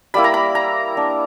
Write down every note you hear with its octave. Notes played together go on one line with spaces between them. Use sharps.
G3 A#3 E4 B5
A#5
B5
A#5
A#3 D4